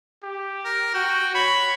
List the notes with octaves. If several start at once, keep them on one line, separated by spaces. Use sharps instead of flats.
G4
A#4
F#4 G5
C#5 B5